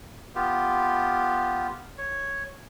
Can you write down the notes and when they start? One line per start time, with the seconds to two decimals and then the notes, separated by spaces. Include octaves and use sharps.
0.35 B3 F4 G4
1.98 C#5